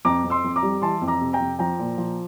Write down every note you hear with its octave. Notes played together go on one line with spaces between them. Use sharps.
F2 A#5 D6
F2
C6 E6
F2
A#5 D6
G3
E3 A5 C6
F2
A#5 D6
C3
G5 A#5
F2
F3 G5 A#5
A#2
F3